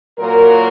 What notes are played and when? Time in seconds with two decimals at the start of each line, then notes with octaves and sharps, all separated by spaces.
0.19 A#2 F#3 A#3 A#4